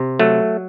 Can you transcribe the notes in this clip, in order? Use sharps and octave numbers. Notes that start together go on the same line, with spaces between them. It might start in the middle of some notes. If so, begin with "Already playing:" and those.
Already playing: C3
F#3 A3